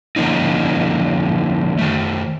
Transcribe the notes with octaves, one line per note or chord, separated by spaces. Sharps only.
D3 F3 A#3 C#4 D#4
D#3 A3